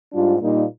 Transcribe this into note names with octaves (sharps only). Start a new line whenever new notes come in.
G#2 G3 D4 F4
A#2 G3 A#3 D#4